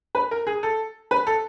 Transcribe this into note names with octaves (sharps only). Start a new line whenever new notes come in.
B4
A#4
G#4
A4
B4
A4